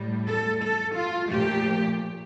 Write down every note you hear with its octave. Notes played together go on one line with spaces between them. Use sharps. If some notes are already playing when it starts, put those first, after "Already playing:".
Already playing: A2 G3
A4
A4
F4
A#2 F3 A3 G4